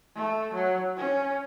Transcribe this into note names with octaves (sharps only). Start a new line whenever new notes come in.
A3
F#3
C#4